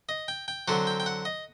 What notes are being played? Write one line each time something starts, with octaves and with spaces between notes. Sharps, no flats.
D#5
G5
G5
D3 F#3 C4 F#5
G5
G5
F#5
D#5